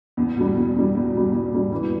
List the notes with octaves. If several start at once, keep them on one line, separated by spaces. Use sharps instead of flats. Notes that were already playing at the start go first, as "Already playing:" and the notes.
E2
B2 G3
E2
B2 G3
E2
B2 G3
E2
B2 G3
E3